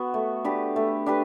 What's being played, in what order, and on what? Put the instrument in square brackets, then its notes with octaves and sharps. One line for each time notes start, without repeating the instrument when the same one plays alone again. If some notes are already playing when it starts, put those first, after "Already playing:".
Already playing: [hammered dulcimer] B3 F#4
A3
D4 G4 B4
A3
D4 G4 B4